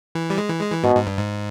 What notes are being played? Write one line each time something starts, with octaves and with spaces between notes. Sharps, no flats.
E3
G3
G#3
E3
G#3
E3
G#2 B2
G#2
G2
G#2